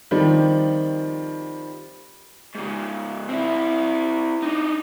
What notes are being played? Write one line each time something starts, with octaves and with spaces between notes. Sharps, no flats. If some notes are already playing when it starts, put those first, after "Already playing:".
D#3 F3 G3 C4
G#2 C#3
C4 E4
D4 D#4